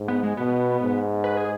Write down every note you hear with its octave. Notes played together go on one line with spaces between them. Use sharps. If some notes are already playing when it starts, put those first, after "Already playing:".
Already playing: G#2
B3
G#3
B2 B3
G#2
B4
G#4